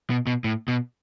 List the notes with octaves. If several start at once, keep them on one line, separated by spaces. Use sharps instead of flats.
B2
B2
A2
B2